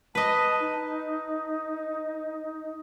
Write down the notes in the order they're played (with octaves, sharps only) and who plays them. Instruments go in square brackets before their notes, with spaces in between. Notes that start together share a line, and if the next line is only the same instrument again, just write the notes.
[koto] B4 D#5 [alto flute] A5
[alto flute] D#4